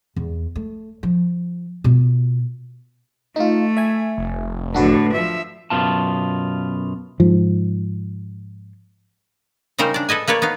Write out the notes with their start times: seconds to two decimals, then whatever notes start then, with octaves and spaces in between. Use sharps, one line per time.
0.16 E2
0.56 A3
1.03 F3
1.84 B2 F4
3.36 A3 D#4 F4
3.77 E5 G#5
4.18 F1
4.74 A2 D3 D4 F#4 B4
5.13 F3 E5
5.70 F#2 B2 F4 A5
7.20 G#2 F3
9.78 C#3 G3 D#4 A#4 C5
9.94 D4 D5
10.09 A4 B4 D#5 G#5
10.28 A#3 B4 C#5 D5
10.42 B3 D#4 F5